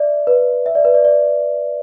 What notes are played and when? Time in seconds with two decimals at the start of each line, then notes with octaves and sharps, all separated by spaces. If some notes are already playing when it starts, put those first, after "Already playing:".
Already playing: D5 E5
0.27 B4
0.66 E5
0.75 D5
0.85 B4
0.94 D5
1.05 D5